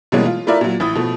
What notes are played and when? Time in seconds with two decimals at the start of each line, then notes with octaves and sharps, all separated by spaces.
0.12 B2 E3 G3 G#3 A#3 C#4
0.26 F4
0.47 A3 E4 F4 A#4 D5 E5
0.61 A#2 F#3
0.80 A1 E4 D#6
0.95 B2 F3 A3